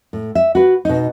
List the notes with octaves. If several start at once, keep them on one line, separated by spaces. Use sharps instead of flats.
A2
E5
F#4 B4
B2 D#4